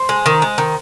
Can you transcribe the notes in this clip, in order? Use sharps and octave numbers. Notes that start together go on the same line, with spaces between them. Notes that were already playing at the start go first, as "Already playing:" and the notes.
Already playing: C5
G#3
D#3
G#3
D#3